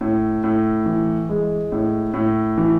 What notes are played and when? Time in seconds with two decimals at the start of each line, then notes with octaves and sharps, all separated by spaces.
0.01 A2
0.44 A2
0.86 E3
1.29 G#3
1.72 A2
2.14 A2
2.58 E3